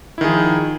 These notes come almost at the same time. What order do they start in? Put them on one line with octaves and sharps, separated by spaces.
E4 D#3 G#4 F3